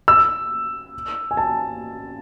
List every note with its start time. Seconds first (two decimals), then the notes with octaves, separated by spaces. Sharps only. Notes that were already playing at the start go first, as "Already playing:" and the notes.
0.08 E6
1.31 G#5
1.37 A5